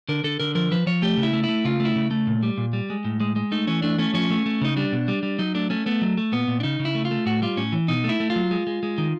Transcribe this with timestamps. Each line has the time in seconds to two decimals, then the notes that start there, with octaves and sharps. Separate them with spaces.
0.09 D3 A#4
0.24 D3 A4
0.40 D3 A#4
0.55 F3 A#4
0.71 F3 B4
0.87 F3 C#5
1.02 A3 G4
1.17 C#3
1.23 E4
1.33 A3
1.44 E4
1.49 A3
1.65 C#3 F4
1.80 A3
1.85 E4
1.96 C#3
2.11 A3
2.27 A#2
2.43 G3
2.58 A#2
2.73 G3
2.90 G#3
3.05 A2
3.20 G#3
3.36 G#3
3.52 A3 D#4
3.67 E3 C#4
3.82 A3 D4
3.98 A3 C#4
4.14 F3 C#4
4.30 A3
4.46 A3
4.61 C#3 D#4
4.77 G3 D4
4.92 B2
5.08 G3
5.23 G3
5.38 F#3 D#4
5.54 A3 D4
5.70 A3 C#4
5.86 A3 B3
6.01 F#3
6.18 A3
6.32 A#2 B3
6.48 A#2
6.60 D4
6.63 C#3 D#4
6.79 C#3
6.85 E4
6.95 A3
7.05 F4
7.11 A3
7.26 A2 F#4
7.42 G3 F4
7.57 A2 C#4
7.72 E3
7.88 B2 D#4
8.04 A3 E4
8.20 A3
8.30 F4
8.36 F#3
8.51 G#3
8.67 G#3
8.83 G#3
8.98 D#3